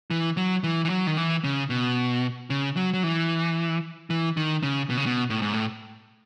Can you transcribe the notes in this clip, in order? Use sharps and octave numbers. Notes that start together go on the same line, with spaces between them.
E3
F#3
E3
E3
F#3
D#3
E3
C#3
B2
C#3
F#3
F#3
E3
E3
D#3
C#3
B2
C#3
B2
A2
G#2
A2